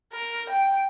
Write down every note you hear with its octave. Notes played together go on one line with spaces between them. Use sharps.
A#4
G5